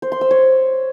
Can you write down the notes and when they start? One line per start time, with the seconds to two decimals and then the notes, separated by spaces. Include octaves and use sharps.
0.02 C5
0.12 C6
0.21 E6
0.31 C#5